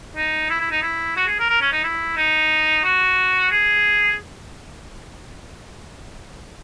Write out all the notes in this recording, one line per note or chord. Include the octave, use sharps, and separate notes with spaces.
D#4
E4
E4
D#4
E4
F#4
G#4
A#4
A#4
C#4
D#4
E4
D#4
F#4
G#4